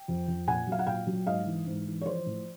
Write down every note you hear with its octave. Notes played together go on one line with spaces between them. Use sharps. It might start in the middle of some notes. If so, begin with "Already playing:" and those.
Already playing: G5
F2
F2
A#2 F#5 G#5
F#3 F5
F#5
A#2 F5 G5
F#3
G#2 D#5 F5
E3
G#2
E3
C#5
F3 C5 D5
A2